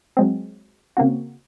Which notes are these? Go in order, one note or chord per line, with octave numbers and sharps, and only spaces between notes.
F#3 G#3 C4
C#3 A#3 C4 F#4